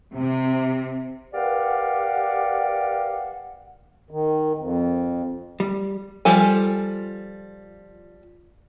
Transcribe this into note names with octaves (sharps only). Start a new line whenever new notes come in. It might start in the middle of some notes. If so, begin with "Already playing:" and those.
C3
G4 A#4 B4 D5 F5 F#5
D#3
F2
G3
F3 G3 A4 G#5